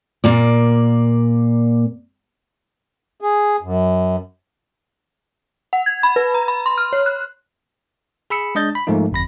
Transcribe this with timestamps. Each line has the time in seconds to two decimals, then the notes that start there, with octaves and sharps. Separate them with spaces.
0.24 A#2 A#3 D5
3.21 G#4
3.62 F#2
5.73 F#5
5.86 G#6
6.03 B5
6.16 B4
6.34 A#5
6.48 B5
6.66 C6
6.78 F6
6.93 C#5
7.06 F#6
8.30 G#4 B5 E6 C#7
8.55 G#3 D4 D#5 G6 A6
8.75 B5
8.87 G#2 F3 A3 A#3 D#4
9.12 G1 F2 B5 A#6